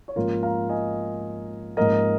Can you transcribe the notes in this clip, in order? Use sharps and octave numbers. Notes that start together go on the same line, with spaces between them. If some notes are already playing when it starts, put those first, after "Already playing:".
C#5
G#2 F3 A#3 C#4 F4 A#4
F5 A#5
D#5 G#5
G#2 F3 A#3 C#4 A#4 D#5